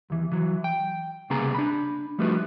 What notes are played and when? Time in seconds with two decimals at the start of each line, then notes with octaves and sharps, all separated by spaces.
0.10 D#2 E3
0.32 E3 F#3
0.64 G5
1.30 C2 C#3 A#3 B3 G#4 A#5
1.54 D4 B5
2.18 F3 G3 A3 D#4 F#4 B4